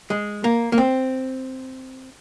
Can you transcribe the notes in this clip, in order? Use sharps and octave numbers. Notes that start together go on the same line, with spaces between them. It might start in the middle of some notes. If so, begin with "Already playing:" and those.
G#3
A#3
A#3
C4